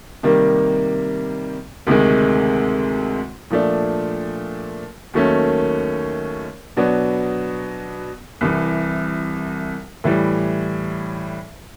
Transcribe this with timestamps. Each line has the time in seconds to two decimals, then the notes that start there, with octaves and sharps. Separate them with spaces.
0.23 C3 D#3 G3 A#3
1.87 D2 C3 D#3 G#3
3.50 A#2 F3 A3 D4
5.14 D#2 D#3 F#3 A3 C#4
6.77 B2 F#3 B3 D4
8.41 C2 C3 E3
10.04 A2 E3 G3